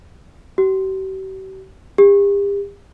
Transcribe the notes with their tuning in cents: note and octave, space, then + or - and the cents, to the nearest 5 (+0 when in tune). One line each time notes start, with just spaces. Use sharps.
G4 -45
G4 +40